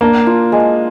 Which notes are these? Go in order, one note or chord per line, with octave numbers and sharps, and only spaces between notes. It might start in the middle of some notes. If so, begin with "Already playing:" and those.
A#3 D4
F4
G#3